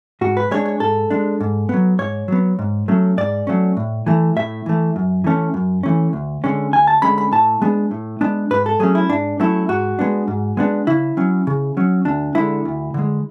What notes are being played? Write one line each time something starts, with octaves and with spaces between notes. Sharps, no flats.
G#2 F#4
B4
G#3 D4 C#5
C#5
G#2 A4
G#3 D4
G#2
F#3 B3
G#2 C#5
F#3 B3
G#2
F#3 A3 C#4
G#2 D5
F#3 A3 C#4
A2
E3 A3
A2 E5
E3 A3
F#2
E3 A3 C#4
F#2
E3 A3 C#4
D2
D3 G#3 C#4
D2 G#5
A5
D3 G#3 C#4 B5
B5
A2 A5
G#3 B3 D4
A2
G#3 B3 D4
G#2 B4
A4
F#3 A3 C#4 G#4
E4
G#2 D4
F#3 A3 C#4 E4
G#2 F#4
G#3 B3 D4
G#2
G#3 B3 D4
C#3 E4
F#3 C#4
C#3
F#3 C#4
D2 D4
D3 G#3 E4
D2
D3 G#3